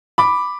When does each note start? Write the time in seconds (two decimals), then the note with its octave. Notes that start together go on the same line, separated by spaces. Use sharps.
0.18 B5 D6